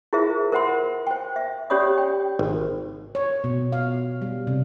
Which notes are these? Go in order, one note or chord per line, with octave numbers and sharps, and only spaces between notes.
E4 F4 G#4 A#4 C5 E5
A#4 C5 E5 F#5 B5 C6
C5 G5
E5
C#4 G4 C#5 D5 B5 D#6
G5
G#1
C#5
B2
F5
G3
C3